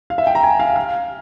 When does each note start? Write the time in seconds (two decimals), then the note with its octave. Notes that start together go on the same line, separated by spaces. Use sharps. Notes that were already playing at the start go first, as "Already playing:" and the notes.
0.10 F5
0.18 E5
0.27 G5
0.35 A#5
0.43 G#5
0.60 F5
0.76 F5